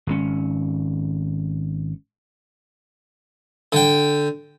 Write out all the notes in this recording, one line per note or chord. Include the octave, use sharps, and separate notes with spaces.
G#1 D#3 C#4
D3 G5